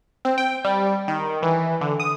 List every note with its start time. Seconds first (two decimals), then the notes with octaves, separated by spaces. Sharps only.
0.25 C4
0.38 G5
0.65 G3
1.08 D#3
1.43 E3
1.81 D3
2.00 D#6